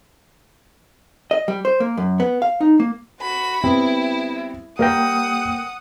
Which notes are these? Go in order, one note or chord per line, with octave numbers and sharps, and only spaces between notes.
D#5
G3
C5
A#3
F#2
B3
F5
D#4
A#3
F#4 B5
G3 B3 C4 E4
G3 A#3 A#4 F#5 G5 D#6 A#6